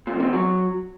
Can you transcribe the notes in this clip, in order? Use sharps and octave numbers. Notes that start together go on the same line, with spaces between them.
A#2
F2
C3
E2
F#3